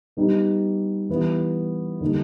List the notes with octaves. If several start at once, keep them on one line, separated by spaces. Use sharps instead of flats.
G3 B3 D#4
E3 G3 B3 E4
D3 G3 A#3 D#4